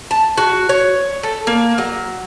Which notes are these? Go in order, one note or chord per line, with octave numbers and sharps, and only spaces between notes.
A5
F#4
C#5
A4
A#3
F#3